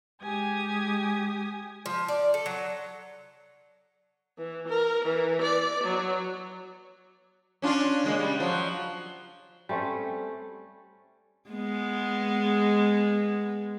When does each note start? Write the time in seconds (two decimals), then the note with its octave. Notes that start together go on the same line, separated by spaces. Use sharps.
0.23 G#3 G4 G#5 D#6 G#6
1.86 F3
2.08 D5
2.34 A4
2.46 F#3
4.37 E3
4.68 A#4
5.05 E3
5.41 D5
5.83 F#3
7.62 C#4 D4 F4
8.04 C#3 G#3 A#3
8.19 G3
8.40 F3 F#3
9.69 G3 A3 C4 C#4
11.50 G#3 B3